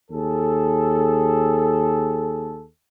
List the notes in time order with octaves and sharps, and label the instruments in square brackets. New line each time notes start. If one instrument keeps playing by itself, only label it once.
[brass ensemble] D#2 G#4 A4